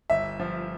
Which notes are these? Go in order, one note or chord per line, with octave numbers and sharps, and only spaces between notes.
G1 E5
F3